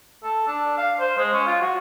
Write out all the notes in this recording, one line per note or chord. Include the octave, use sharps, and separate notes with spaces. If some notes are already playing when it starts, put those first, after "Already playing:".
A4
D4
F5
C5
G#3
C#4
F4
F#4